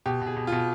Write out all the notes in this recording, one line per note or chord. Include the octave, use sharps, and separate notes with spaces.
B2 G4
B2
G#4
B2
B2 F4